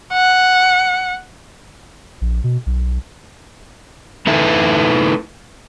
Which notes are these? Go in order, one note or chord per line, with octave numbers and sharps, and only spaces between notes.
F#5
A#1
B2
B1
A3 D#4 E4 A4 B4 E5